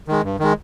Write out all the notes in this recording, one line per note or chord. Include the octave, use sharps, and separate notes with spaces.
D#3 G#3
G2
D#3 G#3